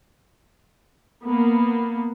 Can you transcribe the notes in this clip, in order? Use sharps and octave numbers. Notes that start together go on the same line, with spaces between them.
A#3 B3